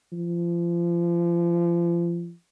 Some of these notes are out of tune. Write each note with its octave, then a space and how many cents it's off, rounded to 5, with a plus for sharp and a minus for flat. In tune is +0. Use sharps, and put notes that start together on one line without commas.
F3 -30